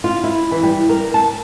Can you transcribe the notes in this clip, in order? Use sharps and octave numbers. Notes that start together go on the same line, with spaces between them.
F4
E4
E3
G3
A#4
A5